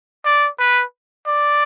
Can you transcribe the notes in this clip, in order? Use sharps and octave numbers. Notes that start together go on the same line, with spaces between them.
D5
B4
D5